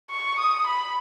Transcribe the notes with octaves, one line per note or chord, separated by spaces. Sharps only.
C#6
D#6
B5